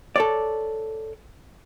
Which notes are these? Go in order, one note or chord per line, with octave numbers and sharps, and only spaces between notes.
A4 C#5 D5